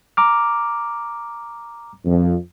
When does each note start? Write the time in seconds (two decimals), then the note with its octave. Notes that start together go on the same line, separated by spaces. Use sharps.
0.17 A#5 D6 F6
2.05 F2